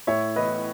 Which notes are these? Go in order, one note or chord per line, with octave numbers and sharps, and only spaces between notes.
A2 C#5 E5
E3 B3 B4 D#5